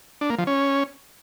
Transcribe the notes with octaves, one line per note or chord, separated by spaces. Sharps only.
D4
A#3
F3
C#4